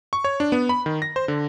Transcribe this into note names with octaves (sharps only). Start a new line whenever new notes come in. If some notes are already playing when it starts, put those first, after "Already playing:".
C#6
C#5
D4
B3
B5
D#3
A#6
C5
D3